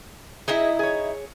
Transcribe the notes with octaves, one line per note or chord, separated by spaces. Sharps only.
D#4 E4 G#4 D#5 E5
G#4 C#5